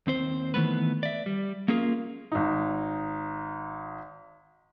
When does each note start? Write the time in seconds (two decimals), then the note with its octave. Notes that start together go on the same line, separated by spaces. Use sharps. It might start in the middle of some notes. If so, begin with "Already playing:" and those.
0.07 D#2 C4 C5
0.54 D#3 E3 A3 B3 B4
1.03 D5 E5
1.26 G3
1.68 A#3 C#4 F4 G#4 A#4
2.32 G#1 D#4